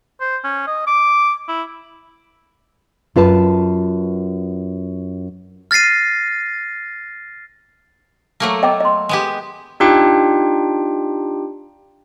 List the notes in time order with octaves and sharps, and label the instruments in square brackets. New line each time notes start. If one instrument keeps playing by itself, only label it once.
[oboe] C5
C#4
D#5
D6
E4
[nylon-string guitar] F#2 F4 B4 A5
[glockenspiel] F6 A6 A#6 C7 D#7
[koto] F#3 A3 A#3
[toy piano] D#5 G5 D6
D#5 C6
[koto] G#3 B3 G4
[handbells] D4 D#4 F4 G4 G5